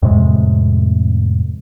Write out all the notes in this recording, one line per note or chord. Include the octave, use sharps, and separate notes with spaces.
F2 A2 C3 G#3